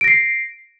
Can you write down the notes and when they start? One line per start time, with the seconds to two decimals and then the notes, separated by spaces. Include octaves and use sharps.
0.01 D7
0.04 A#6
0.08 C7